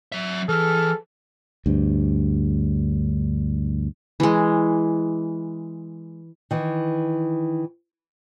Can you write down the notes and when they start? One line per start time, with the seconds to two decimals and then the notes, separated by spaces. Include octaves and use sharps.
0.12 F#3 E5
0.49 E3 G#4 A4 F6
1.66 D2 G2
4.20 E3 G#3
6.51 D#3 E3